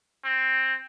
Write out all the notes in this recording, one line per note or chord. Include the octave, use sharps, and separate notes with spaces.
C4